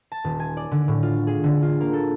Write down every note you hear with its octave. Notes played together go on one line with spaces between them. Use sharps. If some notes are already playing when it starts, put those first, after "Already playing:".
A5
D#1
G#5
D5
D3
A2
F4
G#4
D3
F4
A#3
A4